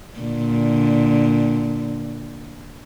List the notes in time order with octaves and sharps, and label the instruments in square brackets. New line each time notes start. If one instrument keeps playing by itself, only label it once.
[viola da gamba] A#2 D3